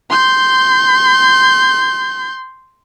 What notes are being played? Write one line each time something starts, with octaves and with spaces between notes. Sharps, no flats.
C6 G6